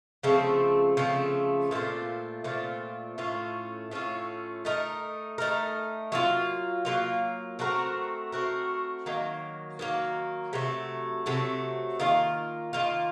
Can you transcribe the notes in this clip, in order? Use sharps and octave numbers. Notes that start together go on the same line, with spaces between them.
C#3 F3 A3 C4
C#3 F3 A3 C4
A#2 A3 C4 F4
A#2 A3 C4 F4
A2 A3 C#4 F4
A2 A3 C#4 F4
A3 D#4 A#4
A3 D#4 A#4
F#3 A#3 F4
F#3 A#3 F4
A3 C4 F#4 A#4
A3 C4 F#4 A#4
D#3 F#3 A#3
D#3 F#3 A#3
C3 F#3 A3
C3 F#3 A3
D#3 A#3 F4
D#3 A#3 F4